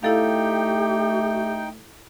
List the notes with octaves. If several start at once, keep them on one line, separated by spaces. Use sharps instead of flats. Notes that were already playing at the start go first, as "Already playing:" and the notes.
A3 D#4 E4 G4 A4 F5 G5